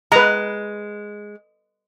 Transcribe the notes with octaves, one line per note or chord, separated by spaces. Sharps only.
G#3 B4 A#5